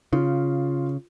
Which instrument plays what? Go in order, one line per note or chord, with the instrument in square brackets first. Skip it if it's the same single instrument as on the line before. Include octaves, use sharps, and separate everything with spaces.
[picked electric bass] C#3 [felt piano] F4